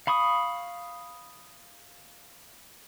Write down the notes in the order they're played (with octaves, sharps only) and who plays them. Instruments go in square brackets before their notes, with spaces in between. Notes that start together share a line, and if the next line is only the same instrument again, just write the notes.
[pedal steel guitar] F5 B5 C#6 D#6